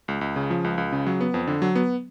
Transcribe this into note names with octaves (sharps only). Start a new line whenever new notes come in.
C#2
C#2
C#3
F3
C#2
C#2
C#3
F#3
B3
F2
D3
F#3
B3